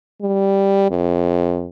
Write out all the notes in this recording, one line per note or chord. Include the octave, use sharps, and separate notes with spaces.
G3
F2